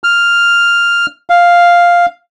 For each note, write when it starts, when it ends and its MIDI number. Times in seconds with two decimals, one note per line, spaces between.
0.04 1.06 89
1.30 2.06 77